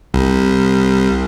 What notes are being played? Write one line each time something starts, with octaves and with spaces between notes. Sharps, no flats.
C2